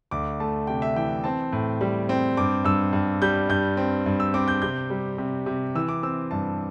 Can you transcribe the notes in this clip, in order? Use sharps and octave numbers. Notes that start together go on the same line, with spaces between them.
D2 D6
A3 A5
C3 G5
E5
E3 G5
C4 A5
A2
G3
C4
G2 D6
G2 E6
G2
G3 G6
G2 G6
C4
G2
E6
C4 D6
G6
C3 G6
G3
C3
C3
E3 E6
D6
C4 E6
G2 A5